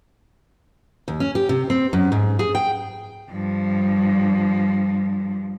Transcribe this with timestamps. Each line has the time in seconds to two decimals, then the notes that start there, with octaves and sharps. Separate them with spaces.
1.08 D#2
1.20 C#4
1.35 G4
1.49 C3
1.70 C4
1.93 F#2
2.12 G#2
2.39 G#4
2.55 G5
3.30 G2 F3